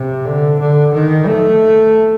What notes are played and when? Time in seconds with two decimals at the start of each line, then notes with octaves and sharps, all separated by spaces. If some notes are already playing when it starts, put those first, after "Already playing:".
Already playing: C3
0.25 D3
0.60 D3
0.93 D#3
1.27 A3